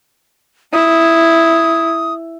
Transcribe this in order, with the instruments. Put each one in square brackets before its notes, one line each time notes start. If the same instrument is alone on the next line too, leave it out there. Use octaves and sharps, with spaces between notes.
[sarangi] E4 [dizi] D#6